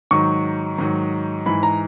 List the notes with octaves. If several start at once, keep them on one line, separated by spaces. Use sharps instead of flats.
G#2 D#3 F#3 C#6
G#2 D#3 F#3
G#2 E3 B5
A#5